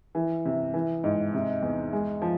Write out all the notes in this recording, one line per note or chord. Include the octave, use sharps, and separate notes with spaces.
E3
C3
E3
G#2
C3
E2
G#3
F3